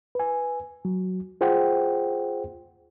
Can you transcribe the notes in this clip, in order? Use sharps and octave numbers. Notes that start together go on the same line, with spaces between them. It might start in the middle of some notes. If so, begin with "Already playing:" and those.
B4 G#5
F#3
F4 G#4 C5 F#5 G5